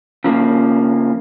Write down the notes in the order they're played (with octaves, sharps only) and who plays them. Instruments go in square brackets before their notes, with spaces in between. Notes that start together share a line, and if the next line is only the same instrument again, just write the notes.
[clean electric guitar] C#3 F3 A#3